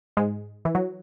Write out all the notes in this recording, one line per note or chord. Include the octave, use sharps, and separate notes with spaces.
G#2 G#3
E3
F#3